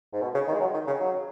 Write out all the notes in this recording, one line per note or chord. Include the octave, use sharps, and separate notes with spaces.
G#2
B2
C#3
D#3
G#3
F#3
D#3
C#3
F#3